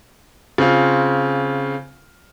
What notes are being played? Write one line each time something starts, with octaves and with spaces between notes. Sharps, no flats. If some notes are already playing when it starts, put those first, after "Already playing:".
C#3 C4 F4